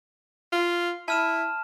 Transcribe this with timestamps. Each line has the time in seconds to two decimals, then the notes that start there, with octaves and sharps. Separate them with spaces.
0.53 F4
1.08 E4 A5 F6 E7